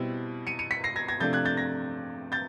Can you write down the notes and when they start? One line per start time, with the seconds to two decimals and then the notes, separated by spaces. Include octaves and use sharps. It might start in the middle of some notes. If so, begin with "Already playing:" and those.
Already playing: B2 G3 C4 E4
0.47 C#7 D#7
0.59 C#7 D#7
0.71 B6 C#7
0.84 A#6 C7
0.96 G#6 A#6
1.08 G#6 A#6
1.20 C3 F3 A3 D4 G6 A6
1.33 F#6 G#6
1.45 G6 A6
1.57 G#6 A#6
2.32 G6 A6